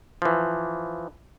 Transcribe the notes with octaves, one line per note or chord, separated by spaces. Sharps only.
E3 F3